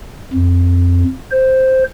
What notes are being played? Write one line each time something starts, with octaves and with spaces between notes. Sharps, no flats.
F2
C5